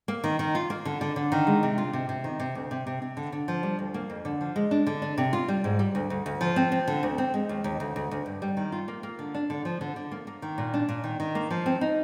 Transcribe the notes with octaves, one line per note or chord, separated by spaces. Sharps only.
A#3
D#3
D#3
F4
A#3
D3
D3
D3
D#3
G#3
C3
F4
C3
C3
D#3
C3
D2
C3
C3
C3
D3
D3
F3
G3
D2
A#3
F2
D3
F3
G#3
D4
D3
D4
C3
F4
G3
G#2
G3
D2
D2
D2
F3
C4
C4
D3
D2
C4
G#3
D#2
D#2
D2
D2
D2
G2
G3
D#3
F4
A#3
A#3
D3
D4
D3
F3
D3
D3
A#3
A#3
D#3
A#2
D4
A#2
D#3
D#3
A#3
F3
C4
D#4